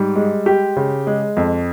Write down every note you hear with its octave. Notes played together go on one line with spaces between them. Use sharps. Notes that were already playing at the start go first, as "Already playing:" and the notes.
Already playing: G#2 G3
G#3
G4
C#3
G#3
F2